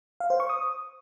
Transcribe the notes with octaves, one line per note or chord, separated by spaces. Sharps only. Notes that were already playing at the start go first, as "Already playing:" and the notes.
F5
C5
C#6
D#6